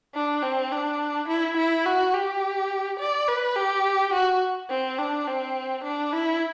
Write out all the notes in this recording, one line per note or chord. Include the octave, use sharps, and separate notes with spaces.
D4
C4
D4
E4
E4
F#4
G4
D5
B4
G4
F#4
C4
D4
C4
D4
E4